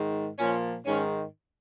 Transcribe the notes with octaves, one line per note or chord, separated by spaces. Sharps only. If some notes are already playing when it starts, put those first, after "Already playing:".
Already playing: G#2 D#3
A#2 F3 C#4
G#2 D#3 C#4